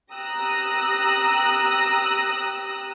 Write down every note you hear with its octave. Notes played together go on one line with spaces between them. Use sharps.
G4 A#5 D#6 E6 F#6 A#6